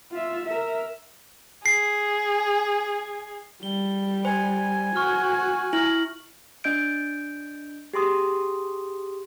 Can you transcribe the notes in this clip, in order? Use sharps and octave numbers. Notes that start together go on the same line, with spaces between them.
F4 E5
A#4 E5
G#4 C7
G3 G7
C5 G#5
F#4 C#6 F6
E4 F6 F#7
D4 D#5 G6 D7
G4 G#4 C6 D#6